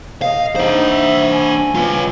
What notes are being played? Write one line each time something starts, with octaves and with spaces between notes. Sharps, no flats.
D#5 F5
D4 D#4 C5
E5
G#5
F4 B4